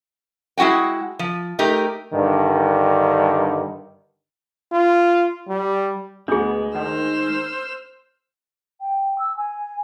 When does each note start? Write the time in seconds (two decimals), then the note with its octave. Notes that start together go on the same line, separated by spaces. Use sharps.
0.57 G#3 E4 F#4 F#5 G5
1.19 F3
1.59 A3 D#4 G4 A#4
2.12 G2 D3 D#3
4.72 F4
5.48 G3
6.28 D2 G#3 B3 D4 G#4
6.74 D#3 C5 E6 F6
8.81 G5
9.18 E6
9.37 G#5